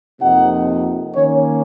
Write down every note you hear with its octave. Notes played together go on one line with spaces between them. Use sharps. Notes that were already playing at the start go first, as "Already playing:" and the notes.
F2 C3 F3 A#3 D#4 F#5
D#3 A#3 C#4 C#5